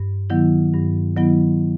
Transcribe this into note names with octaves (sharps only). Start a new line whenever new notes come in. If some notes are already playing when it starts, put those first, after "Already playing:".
Already playing: G2
D#3 F#3 B3 E4
G2
D#3 F#3 B3 E4